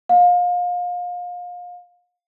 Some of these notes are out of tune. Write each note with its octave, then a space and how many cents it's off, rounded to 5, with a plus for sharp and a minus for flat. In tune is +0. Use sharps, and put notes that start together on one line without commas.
F5 +30